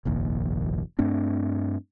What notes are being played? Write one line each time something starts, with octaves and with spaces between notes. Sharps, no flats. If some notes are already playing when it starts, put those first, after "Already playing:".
F1 A#1 D#2
G2 A3 C4 D4